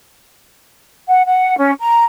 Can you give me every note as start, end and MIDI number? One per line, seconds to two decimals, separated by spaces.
1.08 1.23 78
1.26 1.56 78
1.57 1.72 61
1.80 2.04 82